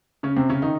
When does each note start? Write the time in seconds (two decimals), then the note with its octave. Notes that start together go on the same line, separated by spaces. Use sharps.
0.23 C#3 C#4
0.36 C3 C4
0.49 C#3 C#4
0.62 D#3 D#4